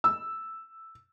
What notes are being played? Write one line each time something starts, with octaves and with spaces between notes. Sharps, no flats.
E6